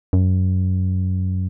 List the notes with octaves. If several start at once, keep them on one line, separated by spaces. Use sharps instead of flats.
F#2